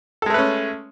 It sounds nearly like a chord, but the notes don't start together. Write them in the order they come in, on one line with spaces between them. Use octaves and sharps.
A4 G#3 A3 B4 C#4